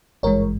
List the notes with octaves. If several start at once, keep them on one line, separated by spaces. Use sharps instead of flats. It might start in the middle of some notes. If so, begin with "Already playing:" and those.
G#1 G2 E3 G#3 A#4 C#5